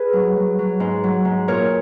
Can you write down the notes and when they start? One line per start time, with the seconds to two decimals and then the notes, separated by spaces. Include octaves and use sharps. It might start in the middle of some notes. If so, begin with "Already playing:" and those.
Already playing: G#4 B4
0.13 F#3
0.36 F#3
0.59 F#3
0.80 G#2
1.04 F#3
1.25 G#2
1.48 A#2 A#4 C#5